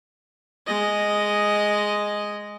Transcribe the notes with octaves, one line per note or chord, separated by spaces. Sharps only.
G#3 D#5